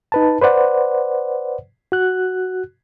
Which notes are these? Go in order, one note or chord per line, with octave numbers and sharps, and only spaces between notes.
D#4 B4 A5
B4 C5 D5 F#5
F#4 F#6